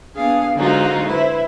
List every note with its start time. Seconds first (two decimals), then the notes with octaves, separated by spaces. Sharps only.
0.16 B3 D4 G#4 F5 G#5
0.55 G#2 D3 F#3 D#4 F4
1.06 E4 B4 C5